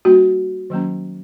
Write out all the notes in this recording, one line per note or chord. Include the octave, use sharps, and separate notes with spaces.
G3 A#3 D4 F#4
D#3 F#3 A#3 C#4